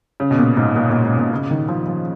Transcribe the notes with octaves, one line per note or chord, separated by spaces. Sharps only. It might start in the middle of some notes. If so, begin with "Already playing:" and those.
C#3
B2
A#2
G#2
A#2
A#2
G#2
A#2
C#3
D#3
F3
F3